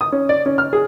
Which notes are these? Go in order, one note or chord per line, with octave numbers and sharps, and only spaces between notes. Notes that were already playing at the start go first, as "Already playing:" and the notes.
D#6
C#4
D5
C#4
F6
G#4